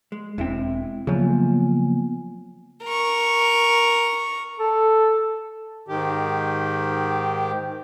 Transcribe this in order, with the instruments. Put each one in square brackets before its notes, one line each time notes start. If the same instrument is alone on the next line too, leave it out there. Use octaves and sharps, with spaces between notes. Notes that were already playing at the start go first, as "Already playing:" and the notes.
[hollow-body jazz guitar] G#3
[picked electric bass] E1 C4 [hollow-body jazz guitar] G#3 E4
[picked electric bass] C#3 F#3 [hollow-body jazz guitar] F3 [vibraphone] A#3 B3 G#5
[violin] A#4 C#6
[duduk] A4
[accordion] G#2 D#3 G4